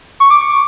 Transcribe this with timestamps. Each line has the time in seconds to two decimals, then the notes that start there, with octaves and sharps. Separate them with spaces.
0.20 C#6
0.30 D6
0.41 C#6